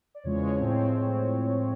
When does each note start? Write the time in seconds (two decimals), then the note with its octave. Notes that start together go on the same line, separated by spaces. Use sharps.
0.15 D5
0.24 E2 C#3 F3 G#3 C#5
0.59 A2 F3 G#3 C4